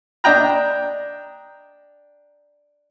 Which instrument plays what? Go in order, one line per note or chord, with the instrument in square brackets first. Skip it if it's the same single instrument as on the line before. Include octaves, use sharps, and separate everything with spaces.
[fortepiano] D4 D#5 G5 A#5